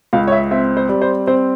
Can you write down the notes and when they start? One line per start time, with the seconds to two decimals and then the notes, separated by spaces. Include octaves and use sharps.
0.13 C#2 F5
0.28 C#5
0.32 E5
0.51 C4 E5
0.77 C5
0.89 G3
1.02 C5
1.27 C4 C5